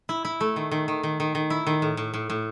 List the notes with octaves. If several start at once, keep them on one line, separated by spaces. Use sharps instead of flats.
E4
E4
A3
D#3
D#3
D#3
D#3
D#3
D#3
E4
D#3
A2
A2
A2
A2